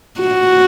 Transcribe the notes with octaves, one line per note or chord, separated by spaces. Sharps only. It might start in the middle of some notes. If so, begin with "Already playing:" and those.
F#4